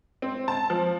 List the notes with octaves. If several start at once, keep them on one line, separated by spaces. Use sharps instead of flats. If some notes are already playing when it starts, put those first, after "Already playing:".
C4
A5
F3